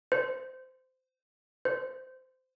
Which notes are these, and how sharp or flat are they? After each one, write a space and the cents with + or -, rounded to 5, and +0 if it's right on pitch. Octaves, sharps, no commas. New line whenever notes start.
C5 -20
C5 -20